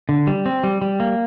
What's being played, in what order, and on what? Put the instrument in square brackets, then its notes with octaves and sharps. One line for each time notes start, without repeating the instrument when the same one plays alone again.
[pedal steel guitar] D3
G3
C4
G3
G3
A#3